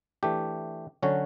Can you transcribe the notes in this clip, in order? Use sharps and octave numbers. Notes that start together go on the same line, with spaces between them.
E3 A3 D4 G4
D3 F#3 C#4 F#4